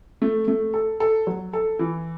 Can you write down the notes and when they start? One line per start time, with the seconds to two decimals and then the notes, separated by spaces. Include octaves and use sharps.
0.22 A3
0.48 A3
0.74 A4
1.00 A4
1.27 F#3
1.53 A4
1.79 E3